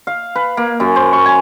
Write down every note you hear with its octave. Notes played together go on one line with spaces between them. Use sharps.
F5
B4
A#3
F#2
C5
C#6
G#5